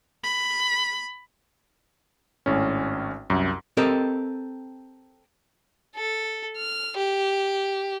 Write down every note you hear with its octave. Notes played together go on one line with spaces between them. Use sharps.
B5
G#1 A2 C#4
C2 F#2
C4 G4 A4 A#4 D#5
A4
F6
G4